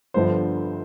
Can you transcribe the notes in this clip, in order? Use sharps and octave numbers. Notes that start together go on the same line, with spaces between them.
G1 G2 D3 F3 C5